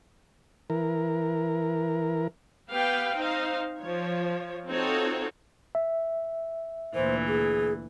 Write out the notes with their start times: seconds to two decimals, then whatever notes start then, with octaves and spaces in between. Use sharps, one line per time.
0.70 E3 A#4
2.70 B3 G4 B4 F5 G5
3.16 C4 D#4 C5 F5
3.79 F3 C#5
4.69 C4 D#4 F4 F#4 A4 C#5
5.75 E5
6.95 D2 A#2 E3 C5
7.28 G#4